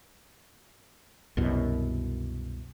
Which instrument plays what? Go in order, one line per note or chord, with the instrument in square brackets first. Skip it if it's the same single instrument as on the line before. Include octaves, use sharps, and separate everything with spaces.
[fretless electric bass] C2 F#2 B2